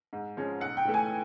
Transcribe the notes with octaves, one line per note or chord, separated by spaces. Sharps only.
G#2
F3 G#3 C#4
B1 F#5
G5
A2 E3 A3
G#5